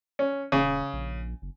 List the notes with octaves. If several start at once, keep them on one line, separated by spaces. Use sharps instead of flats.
C#4
D#1 C#3
A#1
F#1